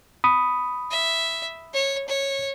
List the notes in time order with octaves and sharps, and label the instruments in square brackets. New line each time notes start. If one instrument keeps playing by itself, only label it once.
[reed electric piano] B5 D#6
[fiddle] E5
C#5
C#5